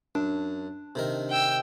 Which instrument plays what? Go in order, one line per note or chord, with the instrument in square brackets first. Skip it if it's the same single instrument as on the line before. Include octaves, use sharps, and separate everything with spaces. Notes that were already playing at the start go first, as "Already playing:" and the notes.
[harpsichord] F#2 [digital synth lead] D4
[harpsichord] C3 D#3 A#4
[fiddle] G5 E6